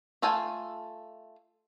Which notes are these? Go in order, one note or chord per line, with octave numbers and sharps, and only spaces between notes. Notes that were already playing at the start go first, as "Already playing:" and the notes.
A3 F4 A4 G5 G#5